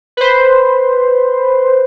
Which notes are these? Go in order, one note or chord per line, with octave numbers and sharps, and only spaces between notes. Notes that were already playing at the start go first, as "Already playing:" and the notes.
B4 C5